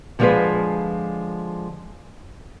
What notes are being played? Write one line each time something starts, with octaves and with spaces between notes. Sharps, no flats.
D3 F3 G#3 F4 G#4 B4